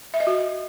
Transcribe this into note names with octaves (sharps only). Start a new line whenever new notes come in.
E5
D#5
F#4